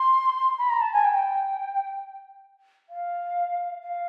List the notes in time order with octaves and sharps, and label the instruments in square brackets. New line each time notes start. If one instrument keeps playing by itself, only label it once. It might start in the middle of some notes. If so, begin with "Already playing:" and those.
Already playing: [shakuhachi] C6
B5
A#5
A5
G#5
G5
F5
F5